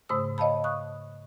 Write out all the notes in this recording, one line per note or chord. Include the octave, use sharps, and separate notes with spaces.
G#2 C#3 A3 C5 D#6 E6
C#5 D#5 F5 A5 B5
C#6 D#6 F#6